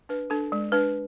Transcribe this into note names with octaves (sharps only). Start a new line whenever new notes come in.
D4 B4
D4 A4
G#3
D4 B4